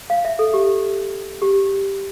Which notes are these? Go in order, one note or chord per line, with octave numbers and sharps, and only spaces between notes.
F5
E5
A4
G4
G4